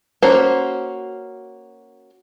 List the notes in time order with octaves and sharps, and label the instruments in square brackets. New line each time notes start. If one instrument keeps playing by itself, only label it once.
[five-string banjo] A#3 C#4 F#4 C5